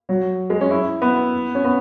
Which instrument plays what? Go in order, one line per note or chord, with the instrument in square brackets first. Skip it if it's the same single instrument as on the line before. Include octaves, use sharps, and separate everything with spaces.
[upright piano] F#3
G#3
C#4
E4
B3
C#4
B3